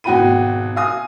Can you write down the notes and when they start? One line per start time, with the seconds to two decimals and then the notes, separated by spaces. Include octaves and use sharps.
0.04 G#1 B2 F#4 G5 B5 D#7
0.76 F5 G#5 D#6